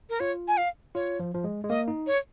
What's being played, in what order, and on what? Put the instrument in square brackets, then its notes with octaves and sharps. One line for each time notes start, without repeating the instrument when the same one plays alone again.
[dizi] A#4
[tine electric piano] F4 [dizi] C#5
[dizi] G#5
F5
[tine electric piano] F4 [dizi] C#5
[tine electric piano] F3
F3
G#3
G#3
[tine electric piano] A#3 [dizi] D#5
[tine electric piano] D#4
[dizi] C#5